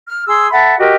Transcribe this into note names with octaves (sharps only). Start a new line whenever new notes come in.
F6
G#4 C6 E6
A4 E5 F#5 B5
F#4 G4 A#4 D#5